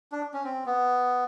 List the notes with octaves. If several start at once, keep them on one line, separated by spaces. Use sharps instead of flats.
D4
C#4
C4
B3